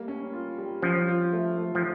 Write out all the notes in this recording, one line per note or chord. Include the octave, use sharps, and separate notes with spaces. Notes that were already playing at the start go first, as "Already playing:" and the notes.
Already playing: G3 A3 A#3
C#4
F4
G3
F3 C#4
F4
A3
A3
F3